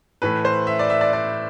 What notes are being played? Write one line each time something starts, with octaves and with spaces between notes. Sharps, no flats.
A2 E3 A3 B4
C5
E5
D5
E5
D5
D5